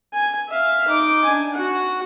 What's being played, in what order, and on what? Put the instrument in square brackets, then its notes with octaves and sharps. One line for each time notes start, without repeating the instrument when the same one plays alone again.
[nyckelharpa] G#5
E5 F5
D#4 D6
D4 G#5
F#4 F#5